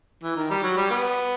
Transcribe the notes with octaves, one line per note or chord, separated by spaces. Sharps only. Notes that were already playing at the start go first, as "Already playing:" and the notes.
E3
D#3
G3
F#3
G3
B3